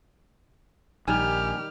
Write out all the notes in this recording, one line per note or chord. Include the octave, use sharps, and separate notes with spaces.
A#1 D#3 G3 G4 G#5 F6